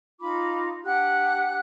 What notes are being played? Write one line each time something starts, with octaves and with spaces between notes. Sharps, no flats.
D#4 F4 B5 D6
D4 G4 F#5 F#6